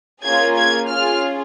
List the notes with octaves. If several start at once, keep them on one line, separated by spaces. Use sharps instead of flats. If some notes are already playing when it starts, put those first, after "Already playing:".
A#3 C#4 F4 G#4 G#6
G#6
C#4 F4 G#4 F6